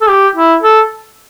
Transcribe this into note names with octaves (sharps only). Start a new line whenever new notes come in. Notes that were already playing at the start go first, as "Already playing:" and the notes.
A4
G4
E4
A4